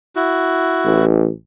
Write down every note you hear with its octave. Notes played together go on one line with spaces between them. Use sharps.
E4 F#4
A1